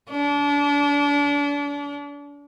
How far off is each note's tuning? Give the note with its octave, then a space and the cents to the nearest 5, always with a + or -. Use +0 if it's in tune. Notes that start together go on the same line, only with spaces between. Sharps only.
D4 -35